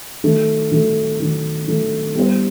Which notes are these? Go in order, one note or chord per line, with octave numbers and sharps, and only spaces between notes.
D#3 F#3 A3
D#3 F#3 A3
D#3 F#3 A3
D#3 F#3 A3
G3 B3 E4 G4 C5